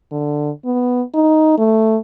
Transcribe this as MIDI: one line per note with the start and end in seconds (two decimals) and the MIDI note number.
0.12 0.51 50
0.65 1.03 59
1.14 1.57 63
1.58 1.98 57